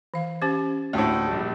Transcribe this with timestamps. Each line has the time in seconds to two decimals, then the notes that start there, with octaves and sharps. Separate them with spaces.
0.14 E3 F5
0.42 C#4 G4 C5
0.93 D2 A2
1.27 A#1 G3